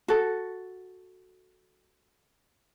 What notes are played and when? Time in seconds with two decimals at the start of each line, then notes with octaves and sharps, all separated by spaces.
0.08 F#4 A4